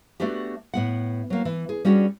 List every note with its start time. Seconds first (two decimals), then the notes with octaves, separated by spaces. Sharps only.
0.20 A3 B3 D4 F#4 G4
0.74 A2 B3 F#5
1.30 F#3 A#3
1.45 E3
1.69 G#4
1.85 G3 C#4 D4 F#4 G#4